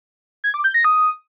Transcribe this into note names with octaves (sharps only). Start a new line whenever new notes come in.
G#6
D6
G6
A#6
D#6